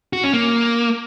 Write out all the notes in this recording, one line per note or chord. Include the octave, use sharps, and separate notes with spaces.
F#4
C#4
A#3